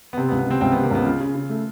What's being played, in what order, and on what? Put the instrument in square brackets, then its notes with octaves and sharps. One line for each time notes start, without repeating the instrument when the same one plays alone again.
[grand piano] B3
[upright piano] C3 [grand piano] C4
[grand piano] B3
[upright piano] C#2
[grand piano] B3
[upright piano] C3 [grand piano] C4
[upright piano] C#2 [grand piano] C4
[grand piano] B3
[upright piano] C3
[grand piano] A#3
[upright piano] C#2 [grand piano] B3
[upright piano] C#3 [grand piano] F4
[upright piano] C#3
C#3
A3